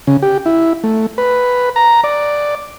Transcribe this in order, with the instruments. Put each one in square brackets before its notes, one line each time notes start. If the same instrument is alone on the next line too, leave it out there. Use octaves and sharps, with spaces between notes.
[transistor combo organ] C#3
G4
E4
A3
B4
A#5
D5